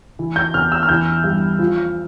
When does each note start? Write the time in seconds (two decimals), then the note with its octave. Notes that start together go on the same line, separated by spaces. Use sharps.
0.19 E3
0.36 G6
0.54 E2 F6
0.72 E6
0.83 F6
0.89 E3 G6
1.24 G2
1.59 F3